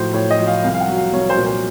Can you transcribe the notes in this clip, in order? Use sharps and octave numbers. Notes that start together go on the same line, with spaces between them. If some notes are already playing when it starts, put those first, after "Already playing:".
Already playing: A2 F3 F#3 C5
A2 C#5
D#5
F3
F5
C2 F5
F5
F#5
F#3
F5
C2 C#5
C5
A#2
C5